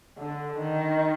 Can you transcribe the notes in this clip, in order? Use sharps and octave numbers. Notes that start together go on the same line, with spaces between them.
D3
D#3